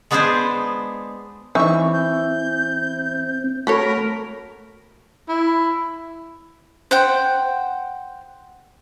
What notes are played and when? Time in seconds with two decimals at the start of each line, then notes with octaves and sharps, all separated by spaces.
0.11 G#3 B3 D4 G#4 B4 C5
1.55 E3 C4 D#4 E5 C#6
1.93 G6
3.67 A3 F#4 A4 A#4 C#5 B5
5.29 E4
6.91 C5 F#5 G5